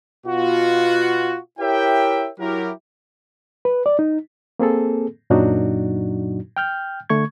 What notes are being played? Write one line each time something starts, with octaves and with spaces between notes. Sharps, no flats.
B2 F4 F#4
E4 G4 A#4 C#5 E5 G5
F#3 E4 G4 A#4
B4
D5
D#4
A#3 C4 G#4 A4
F#2 A#2 F#3 D4 D#4 F#4
G5 F6 G6
D3 A3 C#6 G#6